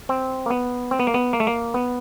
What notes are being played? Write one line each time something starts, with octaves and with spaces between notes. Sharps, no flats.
C4
A#3
B3
C4
B3
A#3
B3
A#3
A3
A#3
B3